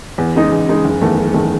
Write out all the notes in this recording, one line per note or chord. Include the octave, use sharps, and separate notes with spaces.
E2
C#3 G#3 D#4
E2
C#3 G#3 D#4
F#1
E2 D#3 A3
F#1
E2 D#3 A3